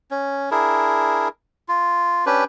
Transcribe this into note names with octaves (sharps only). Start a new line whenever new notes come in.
C#4
D4 E4 G#4 A#4
F4
C#4 D4 G4 B4